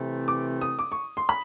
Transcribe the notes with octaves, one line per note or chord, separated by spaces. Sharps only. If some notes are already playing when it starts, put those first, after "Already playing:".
Already playing: C3 E3 A3
D6
D#6
D6
C#6
C6
B5